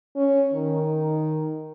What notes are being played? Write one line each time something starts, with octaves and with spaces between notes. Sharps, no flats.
C#4
D#3